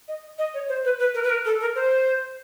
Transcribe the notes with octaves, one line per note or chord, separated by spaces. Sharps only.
D#5
D#5
C#5
C5
B4
B4
A#4
B4
A#4
A4
A#4
C5